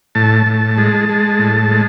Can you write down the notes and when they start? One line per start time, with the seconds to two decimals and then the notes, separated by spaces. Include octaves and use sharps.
0.15 A2 A5
0.46 A2
0.78 G#3
1.09 G#3
1.39 A2
1.71 G#3